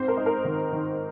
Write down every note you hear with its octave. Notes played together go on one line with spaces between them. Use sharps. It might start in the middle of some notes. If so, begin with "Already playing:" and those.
Already playing: G#2 C4 C5
A#4
D#4
A#4
D#3
D#3